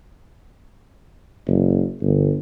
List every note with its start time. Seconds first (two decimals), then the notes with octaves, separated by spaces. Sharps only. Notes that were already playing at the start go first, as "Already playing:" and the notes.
1.47 F#1
2.02 G1